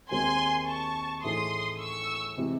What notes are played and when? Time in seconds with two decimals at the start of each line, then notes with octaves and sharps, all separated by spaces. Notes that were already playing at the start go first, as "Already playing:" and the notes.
0.10 D#2 D#3 G#3 C4 G#5 C6
0.67 A5 C#6
1.23 A2 E3 A3 D#4 G#4 C6 D#6
1.79 C#6 E6
2.37 C3 E3 G#3